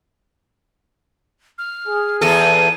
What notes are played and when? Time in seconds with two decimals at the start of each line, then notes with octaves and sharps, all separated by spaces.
1.58 F6
1.88 G#4
2.21 E2 A4 D#7